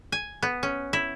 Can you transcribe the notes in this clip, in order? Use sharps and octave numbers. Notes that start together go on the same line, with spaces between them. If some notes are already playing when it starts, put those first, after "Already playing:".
G#5
B3
C#4
E4